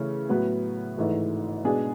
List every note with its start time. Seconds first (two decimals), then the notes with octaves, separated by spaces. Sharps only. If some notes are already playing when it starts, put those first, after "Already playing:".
Already playing: C#3 E3 A3 C#4
0.29 A2 F#3 B3 F#4 B4
0.97 G#1 G#2 E3 A3
1.64 B2 G#3 D4 G#4